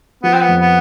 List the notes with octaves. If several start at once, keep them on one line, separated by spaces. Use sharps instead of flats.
F3 B3
C4
B3
F2
B3